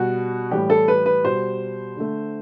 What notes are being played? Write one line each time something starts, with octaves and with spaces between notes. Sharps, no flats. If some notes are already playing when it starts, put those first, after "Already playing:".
Already playing: B2 G3 F#4
A2 E3 G3 G4
A4
B4
B4
B2 G3 C5
D3 A3